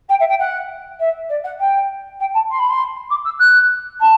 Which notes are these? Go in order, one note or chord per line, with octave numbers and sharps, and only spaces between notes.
G5
E5
G5
F#5
E5
D5
F#5
G5
G5
A5
C6
B5
C6
D6
E6
F#6
A5